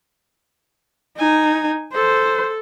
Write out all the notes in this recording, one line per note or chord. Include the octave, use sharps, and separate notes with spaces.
D#4 G#5
A4 C5